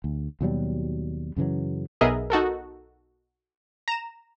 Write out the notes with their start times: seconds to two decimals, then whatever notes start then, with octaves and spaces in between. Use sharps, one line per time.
0.04 D2
0.41 D#2 B2 F#3 G3
1.36 F#2 C#3 E3 F#3
2.01 B1 B3 G#4 A#4 D#5 E5
2.30 D#4 F#4 A4 A#4
3.88 A#5 E7